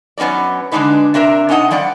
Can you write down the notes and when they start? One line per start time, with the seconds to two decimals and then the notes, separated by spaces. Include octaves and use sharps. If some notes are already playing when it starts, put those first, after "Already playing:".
0.18 F#2 B3 C#4 D#4 D5
0.72 D3 G#3 B3 D4 D#4 B4
1.14 C3 D4 A#4 E5 A#5
1.49 C3 C#4 D#4 D#5 F#5 A5
1.71 F3 G3 D5 F#5